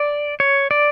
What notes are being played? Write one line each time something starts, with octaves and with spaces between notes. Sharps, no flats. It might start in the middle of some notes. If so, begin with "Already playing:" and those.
Already playing: D5
C#5
D5